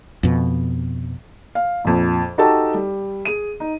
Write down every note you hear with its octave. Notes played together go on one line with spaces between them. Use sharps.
F2 B2
F5
A#1 F2
D#4 F#4 G4 A4 A5
G3
G#4 D#7
D#4